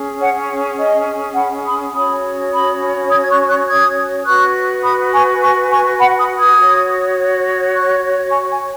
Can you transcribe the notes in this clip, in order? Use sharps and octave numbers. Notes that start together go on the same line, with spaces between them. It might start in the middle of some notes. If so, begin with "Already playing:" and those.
Already playing: C#4 G#4
C#5 F#5
D#5 G#5
F#5 B5
B5 D#6
C#4 F#4 C#5 B5 D#6
B5 D#6
D#6 G#6
G#6
C#6 F#6
C#6 F#6
D#6 G#6
F#4 B4 C#6 F#6
B5 D#6
G#5 C#6
G#5 C#6
G#5 C#6
F#5 B5
B5 D#6
D#6 G#6
F#4 C#5
C#6 F#6
G#5 C#6
G#5 C#6